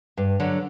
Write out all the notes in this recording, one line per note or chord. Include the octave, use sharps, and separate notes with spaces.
G2
D3 F#3